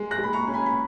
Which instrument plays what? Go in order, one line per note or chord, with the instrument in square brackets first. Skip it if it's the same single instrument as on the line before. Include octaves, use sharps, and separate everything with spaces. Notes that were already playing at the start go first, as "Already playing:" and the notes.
Already playing: [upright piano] G#3
F#6 A#6
G#3 B5
A#5 C#6
C#4
G#5 B5
B5